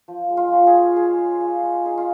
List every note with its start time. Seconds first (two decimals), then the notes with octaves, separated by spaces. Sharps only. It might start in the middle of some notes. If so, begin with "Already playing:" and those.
0.08 F3
0.30 G#3
0.37 F4
0.52 C#4
0.67 G#4
0.74 F3
0.96 G#3 G#4
1.18 C#4
1.41 F4
1.63 G#3
1.85 D#4 G#4
1.98 F4